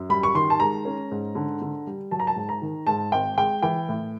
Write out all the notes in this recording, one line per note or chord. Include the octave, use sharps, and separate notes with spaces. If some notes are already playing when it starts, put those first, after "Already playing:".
Already playing: F#2
G3 B5
C#6
D#3 C6
A5
G#3 A#5
C#4
G#2
D3
D3
G3
F#3 A5
A#5
A5
G#2
A#5
D#3
G#2 A5
G#1 G5
G#3 G5
E3 G5
A2